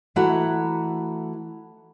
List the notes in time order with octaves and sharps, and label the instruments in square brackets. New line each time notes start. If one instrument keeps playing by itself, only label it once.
[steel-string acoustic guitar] E3 A3 E4 F#4 F#5 A#5